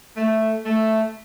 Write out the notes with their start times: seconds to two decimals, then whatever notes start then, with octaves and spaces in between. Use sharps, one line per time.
0.17 A3
0.66 A3